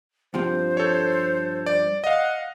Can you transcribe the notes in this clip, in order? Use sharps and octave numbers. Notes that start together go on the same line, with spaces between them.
G2 F3 C4 C5
A4 C#5
D5
D#5 F5 F#5